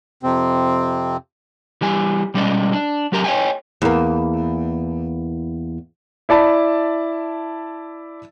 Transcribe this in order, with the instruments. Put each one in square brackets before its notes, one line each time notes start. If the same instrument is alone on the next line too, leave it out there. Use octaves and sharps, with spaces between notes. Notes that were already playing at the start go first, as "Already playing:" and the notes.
[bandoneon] F2 C3 C4
[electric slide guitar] E3 G3 G#5
B2 G3 G#3 C#4 D5 D#5
D4
F#3 G4 A#4 A#5
C#5 D#5 F5 G5 G#5
[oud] E2 A#3
[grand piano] E4 D5 A5 B5